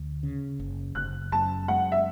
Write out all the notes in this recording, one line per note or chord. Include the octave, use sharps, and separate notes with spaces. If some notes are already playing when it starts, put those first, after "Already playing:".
Already playing: D2
C#3
F#1
F#1 F#6
F#2 A5
G#3 F#5
E5